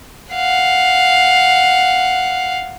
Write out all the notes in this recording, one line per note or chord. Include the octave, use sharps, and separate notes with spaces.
F5 F#5